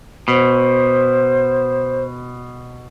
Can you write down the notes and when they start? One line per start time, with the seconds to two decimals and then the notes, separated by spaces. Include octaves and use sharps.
0.28 B2 C5